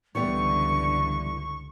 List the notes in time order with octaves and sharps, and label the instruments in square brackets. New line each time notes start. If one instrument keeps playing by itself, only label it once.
[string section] C#2 G2 D3 [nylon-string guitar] E3 G3 B3 [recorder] C#6